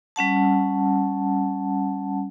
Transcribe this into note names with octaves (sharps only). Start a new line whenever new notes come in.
G3 C#4 F#5 A5